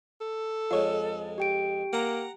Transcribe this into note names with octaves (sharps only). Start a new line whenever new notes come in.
A4
F2 G#3 F4 C#5
G4 G5 D7
A#3 F#5 A#5